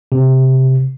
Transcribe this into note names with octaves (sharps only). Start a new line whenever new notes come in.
C3